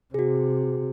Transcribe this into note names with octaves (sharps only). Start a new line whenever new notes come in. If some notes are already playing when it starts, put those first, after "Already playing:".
C3 F#4 G#4